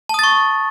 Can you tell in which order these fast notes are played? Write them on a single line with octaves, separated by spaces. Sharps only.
A5 D#6 A6 C#6